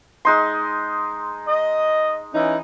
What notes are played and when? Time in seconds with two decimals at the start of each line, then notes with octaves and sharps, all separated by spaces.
0.25 G#3 D#4 C6
1.48 D#5
2.33 E3 C#4 D#4